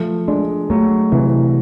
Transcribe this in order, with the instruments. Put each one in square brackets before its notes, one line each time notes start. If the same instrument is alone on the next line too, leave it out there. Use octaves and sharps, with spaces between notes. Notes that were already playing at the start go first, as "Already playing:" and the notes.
Already playing: [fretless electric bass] F3 [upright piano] A3
[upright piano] G#3 [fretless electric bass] D4
[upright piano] F#3 [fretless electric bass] A3
[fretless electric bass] C3 [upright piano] E3